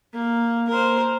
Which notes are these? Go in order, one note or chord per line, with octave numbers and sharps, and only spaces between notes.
A#3
A#4 C5